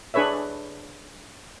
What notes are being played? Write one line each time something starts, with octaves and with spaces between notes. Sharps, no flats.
D4 G#4 B4 C#5 E5